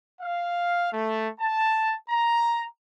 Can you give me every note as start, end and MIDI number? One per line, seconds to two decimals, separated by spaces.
0.21 0.88 77
0.93 1.29 57
1.40 1.93 81
2.10 2.64 82